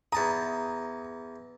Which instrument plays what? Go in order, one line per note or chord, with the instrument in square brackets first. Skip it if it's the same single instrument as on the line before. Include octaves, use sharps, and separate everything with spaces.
[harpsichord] E2 A5 D#6 [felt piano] A#5